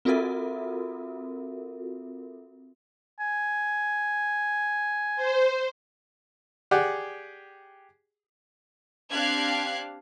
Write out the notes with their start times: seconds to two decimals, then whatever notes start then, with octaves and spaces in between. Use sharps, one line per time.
0.05 C4 F4 F#4 A4 A#4 E5
3.20 G#5
5.16 C5
6.71 G4 G#4 D5 F#5
9.12 C4 D4 G4 F5 F#6 G#6